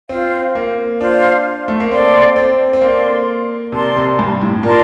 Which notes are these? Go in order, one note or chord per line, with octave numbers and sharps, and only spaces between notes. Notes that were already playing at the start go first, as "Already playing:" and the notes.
C4 F4 C5 F5
A#3
D4 F4 C5 F5
A3
A#3
C4 A4 D5 F5 C6
C4
C4
A#3 A4 D5 F5 C6
C3 A#4 D5 A5 C6
C3
G2
A2
A#2 A#4 D5 A5 C6